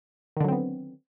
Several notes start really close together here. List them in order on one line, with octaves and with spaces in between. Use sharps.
D#3 D3 F#3 C4 B3